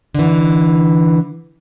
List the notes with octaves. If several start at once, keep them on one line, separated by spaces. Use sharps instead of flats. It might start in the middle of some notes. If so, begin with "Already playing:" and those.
D3 E3